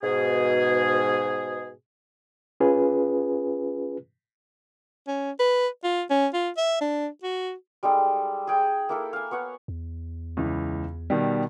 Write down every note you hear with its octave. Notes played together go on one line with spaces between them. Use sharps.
G#2 B2 G#4
C#4 F4 G#4 B4
C#4
B4
F4
C#4
F4
E5
D4
F#4
G3 G#3 D#4 A4
G#4 G5
A#3 E4 A4
F5 G#5
B3 C#5 F#5
E2
C#2 E3
B2 D#3 G3